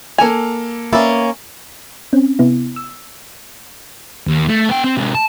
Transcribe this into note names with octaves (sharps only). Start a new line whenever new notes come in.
A#3 A4 G#5 F7
A#3 C#4 B4 D5 E5
C4 C#4
C3 B3 E4
E6
D#2
A3
B3 G5
C4
C3 G#3
A5